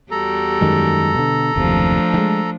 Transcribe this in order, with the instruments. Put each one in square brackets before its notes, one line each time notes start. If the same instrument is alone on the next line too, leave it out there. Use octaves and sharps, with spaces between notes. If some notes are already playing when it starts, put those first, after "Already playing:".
[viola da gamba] E2 G3 F#4 [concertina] A4 A#5
[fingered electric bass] F#2 D#3 G#3
B2 D3
[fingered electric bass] F#1 D#2 C3 [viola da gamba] F3 A3 D4
[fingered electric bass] D#3 G#3